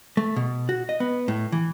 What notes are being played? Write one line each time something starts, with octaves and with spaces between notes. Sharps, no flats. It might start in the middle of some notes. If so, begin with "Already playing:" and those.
A3
B2
F#4
D#5
B3
A2
E3